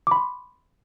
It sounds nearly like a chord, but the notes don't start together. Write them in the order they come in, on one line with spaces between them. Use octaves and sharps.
D6 B5 C6